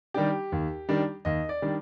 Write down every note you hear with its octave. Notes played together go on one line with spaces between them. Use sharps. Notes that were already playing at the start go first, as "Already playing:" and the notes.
D#3 G3 D4 G4
D#2
D#3 G3 D4
D#2 D#5
D5
D#3 G3 D4